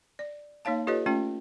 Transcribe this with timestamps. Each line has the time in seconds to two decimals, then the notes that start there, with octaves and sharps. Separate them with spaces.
0.19 D5
0.65 A#3 D#4 C#5 F5 A5
0.87 F4 G4 A4 B4 C#5 D#5
1.06 A3 C#4 F4 G5